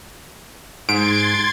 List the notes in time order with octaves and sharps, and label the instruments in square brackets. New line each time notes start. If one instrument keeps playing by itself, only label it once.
[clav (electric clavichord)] G#2 [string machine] C6 G#6 A6 [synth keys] D7